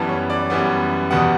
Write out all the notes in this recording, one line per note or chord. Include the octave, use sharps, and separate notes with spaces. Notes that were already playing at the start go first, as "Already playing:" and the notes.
Already playing: F#2 E3 G3 B3 A5
C#5
D5
F#2 E3 G3 B3
E2 B2 G3 B3 F#5